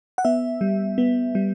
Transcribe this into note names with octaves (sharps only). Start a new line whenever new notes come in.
F#5
B3 E5
G3
B3
G3